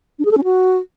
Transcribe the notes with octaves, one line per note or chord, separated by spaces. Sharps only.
D4
G#4
A4
C#4
F#4